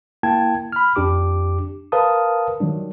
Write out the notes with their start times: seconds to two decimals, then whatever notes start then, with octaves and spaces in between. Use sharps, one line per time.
0.23 A#3 E4 G5 A5 G#6
0.72 B5 F6
0.96 F2 D4 G4 D6
1.92 A#4 B4 F5 A5 D#6
2.60 D#3 F#3 G3 D4